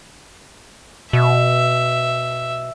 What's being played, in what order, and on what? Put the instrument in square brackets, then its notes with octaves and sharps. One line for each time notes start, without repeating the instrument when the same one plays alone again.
[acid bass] B2 [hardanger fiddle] E5